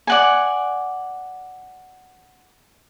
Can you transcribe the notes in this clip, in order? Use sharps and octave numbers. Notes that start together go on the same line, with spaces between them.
D5 F#5 G#5